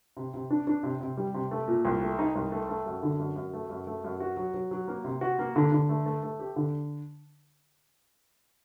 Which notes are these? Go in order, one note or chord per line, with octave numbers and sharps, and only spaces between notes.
C3
C3
D4
D4
C3
C3
G3
C3
A3
A#2
C2
A3
D#4
C2
A3
A3
F#2
D3
F#2
F#2
A3
F#2
A3
F#2
F#4
F#3
F#3
F#3
A#3
C3
F#4
A#3
D3
D3
A3
A3
A3
G4
D3